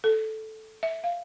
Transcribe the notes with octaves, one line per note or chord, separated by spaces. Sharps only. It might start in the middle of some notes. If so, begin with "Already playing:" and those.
A4
E5
F5